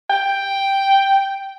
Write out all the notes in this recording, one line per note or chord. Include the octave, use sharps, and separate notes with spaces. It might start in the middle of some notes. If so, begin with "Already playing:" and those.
G5